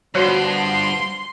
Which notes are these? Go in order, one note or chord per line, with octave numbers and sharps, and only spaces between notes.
G2 D3 F3 B3 F#4 C5 C#5 C6